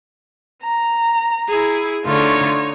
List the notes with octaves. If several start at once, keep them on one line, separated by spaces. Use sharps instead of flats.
A#5
E4 G#4
D3 A3 D#4 F4 C#5